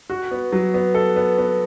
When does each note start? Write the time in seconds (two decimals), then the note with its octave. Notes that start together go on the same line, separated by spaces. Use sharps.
0.10 F#4
0.31 B3
0.52 F#3
0.74 B3
0.94 A4
1.16 B3
1.38 B3